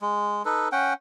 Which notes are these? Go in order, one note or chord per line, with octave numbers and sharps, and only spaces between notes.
G#3
D#4 A4 B4
C#4 F#5 G5